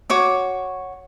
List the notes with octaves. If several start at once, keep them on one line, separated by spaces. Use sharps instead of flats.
F#4 C#5 D6